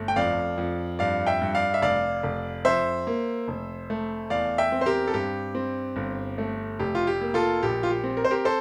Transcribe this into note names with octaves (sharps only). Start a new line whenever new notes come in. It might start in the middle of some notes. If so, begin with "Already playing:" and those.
Already playing: G1 A3
G5
F2 D5 F5
F2
G2 D5 F5
E5 G5
G2
D5 F5
E5
F1 D5 F5
F1
F2 C5 E5
A#3
F1
A3
E2 D5 F5
E5 G5
C4
C5
G4 A#4
A4
G2 G4
C4
G1
A3
F1 G4
F4
G4
A#3
F4 A4
A#1 G4
F4
G4
C4
A#4
C5
G4 A#4
A4 C5